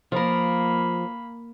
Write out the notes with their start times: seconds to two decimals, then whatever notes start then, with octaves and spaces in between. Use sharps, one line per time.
0.12 F3 A#3 A#4 B5